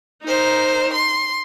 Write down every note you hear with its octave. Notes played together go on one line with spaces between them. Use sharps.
D#4 A#4 C5
C6